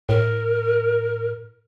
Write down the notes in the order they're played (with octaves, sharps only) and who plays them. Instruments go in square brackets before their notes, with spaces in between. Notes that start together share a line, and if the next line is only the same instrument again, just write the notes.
[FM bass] A2 [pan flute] A#4